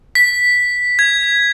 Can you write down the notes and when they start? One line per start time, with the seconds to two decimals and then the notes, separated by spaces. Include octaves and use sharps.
0.15 B6
0.99 G#6